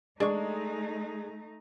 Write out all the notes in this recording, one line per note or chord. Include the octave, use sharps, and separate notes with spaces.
G#3 A3 D4 D#4 C#6